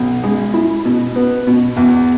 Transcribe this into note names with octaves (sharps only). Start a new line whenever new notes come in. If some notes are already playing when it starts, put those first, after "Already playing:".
Already playing: B1
G#3
E4
B2
B3
B2
E2